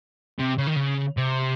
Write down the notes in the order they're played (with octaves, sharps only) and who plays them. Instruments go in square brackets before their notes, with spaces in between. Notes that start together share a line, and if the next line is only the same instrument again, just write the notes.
[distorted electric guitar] C3
C#3
D#3
C#3
C3